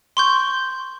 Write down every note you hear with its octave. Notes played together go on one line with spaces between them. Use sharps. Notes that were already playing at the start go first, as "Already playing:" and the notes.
C6 C#6 G6